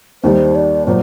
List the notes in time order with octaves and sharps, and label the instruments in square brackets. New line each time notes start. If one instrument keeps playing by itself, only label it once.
[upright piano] D#2 D#3 G3 [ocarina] C5
[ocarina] D5
[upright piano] A#2 F#3 [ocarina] C5